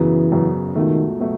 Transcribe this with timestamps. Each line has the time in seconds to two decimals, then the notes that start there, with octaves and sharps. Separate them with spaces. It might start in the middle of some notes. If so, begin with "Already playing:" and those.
Already playing: F#2 C#3 E3 F#3 B3
0.32 F#2 C#3 F#3 B3
0.75 C#2 B2 D#3 F#3 A3
1.20 B2 F#3 A3